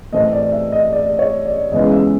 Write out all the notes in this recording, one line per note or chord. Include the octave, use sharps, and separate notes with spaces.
A2 E3 A3 C4 D#5
D5
E5
D#5
D5
C#5
D5
E2 C#3 E3 G#3 B3 D#5
E5